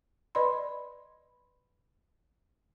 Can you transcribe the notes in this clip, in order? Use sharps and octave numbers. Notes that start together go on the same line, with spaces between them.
B4 D5 D#5 B5 C6